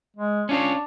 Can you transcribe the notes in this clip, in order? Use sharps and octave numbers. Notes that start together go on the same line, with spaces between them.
G#3
C#4 D4 F4 C#5